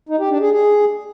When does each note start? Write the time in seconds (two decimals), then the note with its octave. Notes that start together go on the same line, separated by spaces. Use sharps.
0.09 D#4
0.20 G4
0.30 D4
0.41 G#4
0.51 G#4